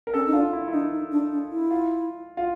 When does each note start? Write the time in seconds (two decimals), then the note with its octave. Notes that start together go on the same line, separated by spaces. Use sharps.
0.07 A#4
0.14 C#4 A4
0.27 D#4
0.33 D4 F4
0.53 E4
0.68 E4
0.73 D4 D#4
0.93 D#4
1.12 D4
1.32 D4
1.52 E4
1.71 F4
2.37 F4